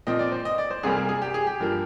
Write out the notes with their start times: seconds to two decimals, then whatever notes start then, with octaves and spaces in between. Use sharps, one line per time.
0.07 A#2 F3 C4 D#5
0.19 D5
0.32 C5
0.45 D#5
0.58 D5
0.71 C5
0.83 C2 C3 G3 A#3 G#4
0.96 G#4
1.09 G#4
1.22 G4
1.34 G#4
1.47 G4
1.60 G2 F3 A#3